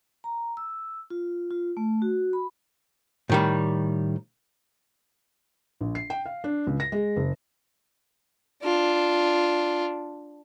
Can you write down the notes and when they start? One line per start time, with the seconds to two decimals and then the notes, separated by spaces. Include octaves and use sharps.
0.24 A#5
0.57 E6
1.10 F4
1.51 F4
1.77 A3
2.02 F#4
2.33 B5
3.30 A2 D#3 G3
5.81 A#1
5.95 C7
6.10 G5
6.26 F5
6.44 D4
6.67 C#2
6.80 A#6
6.92 G#3
7.16 F#1
8.63 D4 F4